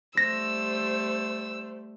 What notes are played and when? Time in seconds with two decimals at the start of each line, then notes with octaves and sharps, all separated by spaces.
0.18 G3 A3 C5 E6 A#6